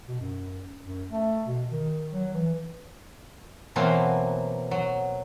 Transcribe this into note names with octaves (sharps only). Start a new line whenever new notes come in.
B2
F#2
F#2
A3
B2
D#3
F#3
E3
B2 E3 F#3 A#3 C4
F#3